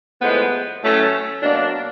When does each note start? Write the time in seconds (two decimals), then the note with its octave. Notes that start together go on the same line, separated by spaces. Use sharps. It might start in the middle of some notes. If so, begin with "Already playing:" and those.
0.21 A2 F3 G#3 B3
0.82 A2 F#3 A3 C#4
1.42 B2 F#3 A#3 D4